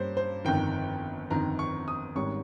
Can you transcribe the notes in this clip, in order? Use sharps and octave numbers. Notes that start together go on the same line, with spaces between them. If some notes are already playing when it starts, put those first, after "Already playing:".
Already playing: G2 G3 A#3 C#4 C5
C5
G1 F2 D#3 G5
G1 F2 D#3 A#5
C#6
D#6
G#1 G#2 G3 C#4 C#6